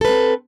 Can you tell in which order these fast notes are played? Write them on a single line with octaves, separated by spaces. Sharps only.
A4 B4 C4